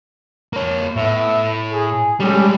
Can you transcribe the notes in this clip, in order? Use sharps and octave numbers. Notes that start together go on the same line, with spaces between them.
A#3 C#5
A2 B3 E5
G#4
G3 G#3 C#4 G4 A4